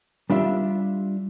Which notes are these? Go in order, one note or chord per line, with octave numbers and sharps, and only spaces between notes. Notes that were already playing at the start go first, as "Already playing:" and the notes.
G3 D4 F4 E5